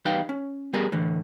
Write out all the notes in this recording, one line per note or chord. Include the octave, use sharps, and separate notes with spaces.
E2 G3 D#4 B4 F5 G5
C#4
G3 B3 G4 G#4 A#4 D5
A2 D3 E3